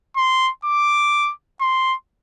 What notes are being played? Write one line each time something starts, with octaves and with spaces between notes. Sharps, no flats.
C6
D6
C6